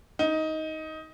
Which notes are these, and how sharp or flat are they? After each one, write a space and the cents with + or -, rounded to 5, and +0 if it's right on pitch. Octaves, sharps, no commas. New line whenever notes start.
D#4 +15